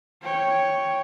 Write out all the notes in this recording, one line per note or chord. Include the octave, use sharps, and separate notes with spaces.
C#5 G5